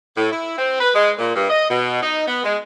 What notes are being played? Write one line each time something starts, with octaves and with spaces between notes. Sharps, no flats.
A2
E4
C4
B4
G#3
A#2
G2
D#5
B2
D#4
B3
G#3